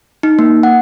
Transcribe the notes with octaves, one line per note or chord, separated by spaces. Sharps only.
D#4
A#3
F#5